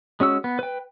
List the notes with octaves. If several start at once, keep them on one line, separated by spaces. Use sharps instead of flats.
G#3 C#4 F#4 E6
B3
B4 G5